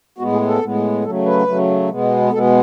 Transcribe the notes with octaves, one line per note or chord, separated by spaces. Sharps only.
A2 G#3 B3 F#4
G#4
A4
A2 G#3 B3
C#3 F#3 A3 A4
B4
C#3 F#3 A3
B2 G#3 B3
B2 G#3 B3 A4